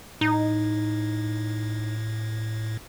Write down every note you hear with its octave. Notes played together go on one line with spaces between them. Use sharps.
A2 D#4